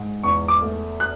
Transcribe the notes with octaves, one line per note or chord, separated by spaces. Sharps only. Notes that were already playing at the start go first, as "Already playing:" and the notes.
Already playing: G#2
E2 C#6
D6
A3
F#6